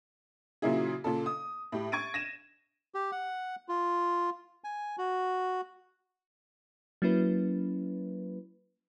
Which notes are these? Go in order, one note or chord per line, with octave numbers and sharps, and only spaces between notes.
A#2 C#3 F#3 A#3 E4 G#4
A#2 C#3 A4
D#6
A2 G4
C#6 G#6 A6 D7 D#7
A#6 D#7 E7
G4
F#5
F4
G#5
F#4
F#3 A#3 C#4 E4 B4